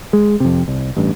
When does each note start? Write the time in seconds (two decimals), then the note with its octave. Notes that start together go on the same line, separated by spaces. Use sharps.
0.13 G#3
0.40 F2 C3
0.68 C2
0.97 A1 G2